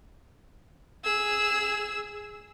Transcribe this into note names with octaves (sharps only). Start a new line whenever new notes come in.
G#4 E6